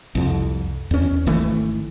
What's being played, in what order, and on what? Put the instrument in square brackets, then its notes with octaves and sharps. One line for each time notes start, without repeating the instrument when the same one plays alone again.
[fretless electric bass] C2 F2
E2 C#4
G#1 D#3 E3 A3